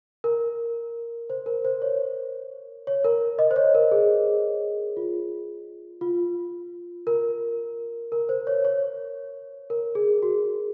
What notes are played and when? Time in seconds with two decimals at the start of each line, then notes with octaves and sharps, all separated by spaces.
0.24 A#4
1.30 C5
1.46 A#4
1.65 C5
1.82 C#5
2.87 C#5
3.04 A#4
3.39 D#5
3.51 C5
3.56 C#5
3.75 A#4
3.92 G#4
4.97 F4
6.01 F4
7.07 A#4
8.12 A#4
8.29 C5
8.47 C#5
8.65 C#5
9.70 A#4
9.95 G#4
10.23 F#4